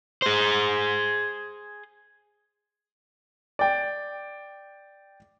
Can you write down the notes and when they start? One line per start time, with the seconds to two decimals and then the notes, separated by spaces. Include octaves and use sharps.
0.22 G#4 C5
3.59 D5 G5